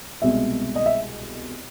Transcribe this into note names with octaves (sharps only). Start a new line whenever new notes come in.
C2 B2 G#3 E5
D#5
E5